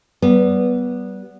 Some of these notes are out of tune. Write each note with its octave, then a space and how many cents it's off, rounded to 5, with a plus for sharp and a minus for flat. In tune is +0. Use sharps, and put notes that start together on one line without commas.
G3 -30 B3 -10